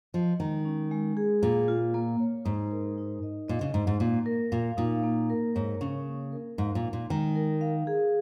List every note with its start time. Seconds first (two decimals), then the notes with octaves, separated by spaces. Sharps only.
0.14 F3 D#5
0.39 D#3 G#3
0.65 C#4
0.91 G#3
1.17 G#4
1.42 A#2 A#3
1.68 F4
1.94 A#3
2.20 C#5
2.45 G#2 D#4
2.72 A#4
2.98 D#4
3.23 D#5
3.48 A#2 D#5
3.61 C#3
3.74 G#2 D#4
3.87 G#2
4.00 A#2 A#3
4.26 A#4
4.52 A#2 F5
4.77 A#2 D#4
5.03 A#3
5.30 A#4
5.55 G#2 C#5
5.81 C#3 C#4
6.07 A#3
6.32 A#4
6.58 G#2 F5
6.75 A#2
6.85 D#4
6.93 A#2
7.10 D#3 G#3
7.35 A#4
7.61 F5
7.87 G#4